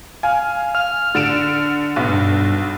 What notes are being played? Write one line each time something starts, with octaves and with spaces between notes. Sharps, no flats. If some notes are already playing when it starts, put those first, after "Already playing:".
F5 G#5
F6
D3 D7 E7
B1 B3
G2